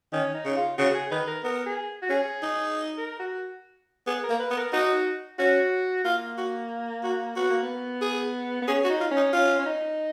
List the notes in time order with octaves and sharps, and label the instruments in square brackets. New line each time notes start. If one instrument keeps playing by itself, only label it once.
[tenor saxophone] D#3 [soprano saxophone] C#4
[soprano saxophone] D#4
[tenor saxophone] C#3
[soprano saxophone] F4
[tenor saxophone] C#3 [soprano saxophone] F#4
[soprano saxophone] G#4
[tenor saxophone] D#3 [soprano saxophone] B4
[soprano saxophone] A#4
[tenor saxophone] B3 [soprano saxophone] A#4
[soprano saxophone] G#4
F#4
[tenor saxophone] C#4 [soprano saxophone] G#4
[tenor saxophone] D#4
[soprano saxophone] A#4
F#4
[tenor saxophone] B3 [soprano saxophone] G#4
[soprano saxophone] A#4
[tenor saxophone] A#3
[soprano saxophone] B4
[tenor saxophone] B3
[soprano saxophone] A#4
[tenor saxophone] D#4 [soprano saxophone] F#4
[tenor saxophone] C#4 [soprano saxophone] F#4
[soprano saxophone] A#3 [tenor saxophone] F4
[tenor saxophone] F#4
F#4
[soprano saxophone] B3 [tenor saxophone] F#4
[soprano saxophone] A#3
B3
[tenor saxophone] G#4
[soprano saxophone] B3
[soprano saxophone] C#4 [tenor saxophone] G#4
[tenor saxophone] F#4
[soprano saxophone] D#4
[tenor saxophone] F4
[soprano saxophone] C#4
[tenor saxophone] D#4
[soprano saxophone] C#4 [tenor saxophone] F4
[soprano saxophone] C#4
D#4